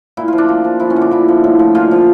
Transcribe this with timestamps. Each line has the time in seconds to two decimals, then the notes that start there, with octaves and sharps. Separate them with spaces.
0.17 A#2 E4
0.28 F3 F4
0.38 D4
0.49 A#2
0.64 F3
0.80 F3 E4
0.90 C#4
0.96 D3
1.01 D4
1.11 A#2 E4
1.28 F3
1.44 A2
1.59 F3
1.75 A#2 F4
1.91 F3